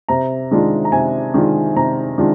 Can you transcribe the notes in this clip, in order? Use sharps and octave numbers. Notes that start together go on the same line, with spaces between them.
C3 A#5
D#3 G#3 D4 F4
A#5
C3 G#5
D#3 G#3 D4 F4
C3 A#5
D#3 G#3 D4 F4